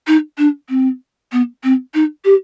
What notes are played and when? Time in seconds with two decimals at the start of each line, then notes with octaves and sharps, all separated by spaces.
0.07 D#4
0.38 D4
0.69 C4
1.32 B3
1.63 C4
1.94 D#4
2.24 G4